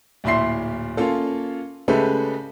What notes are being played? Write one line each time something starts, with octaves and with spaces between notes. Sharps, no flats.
D1 A#2 E4 E5 C6 C7
A#3 C#4 F4 A4
C#3 G#3 A3 G4 A4 B4